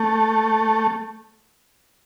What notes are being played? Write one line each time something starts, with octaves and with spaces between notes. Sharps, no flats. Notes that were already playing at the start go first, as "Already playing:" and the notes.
Already playing: A3